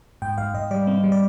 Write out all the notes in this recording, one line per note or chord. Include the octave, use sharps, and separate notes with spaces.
G#2 G5
G#2 F5
G#2 D#5
G3 D5
C4
G3
D5